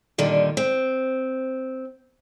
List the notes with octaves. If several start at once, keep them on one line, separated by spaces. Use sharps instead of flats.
A#2 D3 D#3 G3
C4